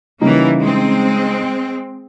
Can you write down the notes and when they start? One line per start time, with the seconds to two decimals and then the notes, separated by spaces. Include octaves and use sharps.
0.21 C#3 E3 G3 A#3 D#4
0.60 G#3 C4